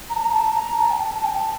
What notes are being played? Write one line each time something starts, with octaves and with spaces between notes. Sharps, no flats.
A#5
A5
A#5
A5
A#5
A5
G5
A5
A5
G5
A5